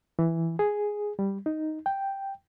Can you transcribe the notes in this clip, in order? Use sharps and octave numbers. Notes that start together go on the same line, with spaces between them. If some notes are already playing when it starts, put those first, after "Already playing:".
E3
G#4
G3
D#4
G5